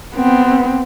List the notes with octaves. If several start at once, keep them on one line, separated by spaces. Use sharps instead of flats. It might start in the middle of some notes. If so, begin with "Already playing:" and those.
B3 C4